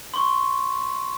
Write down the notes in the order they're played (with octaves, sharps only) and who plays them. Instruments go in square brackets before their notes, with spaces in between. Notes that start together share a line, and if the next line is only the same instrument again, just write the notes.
[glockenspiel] C6 C#6